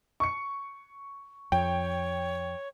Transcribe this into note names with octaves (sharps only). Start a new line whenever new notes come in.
C#6 C#7
F2 C#5 G5